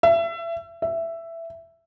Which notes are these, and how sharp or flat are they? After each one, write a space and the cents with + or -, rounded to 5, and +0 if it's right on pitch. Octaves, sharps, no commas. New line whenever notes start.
E5 +30
E5 +10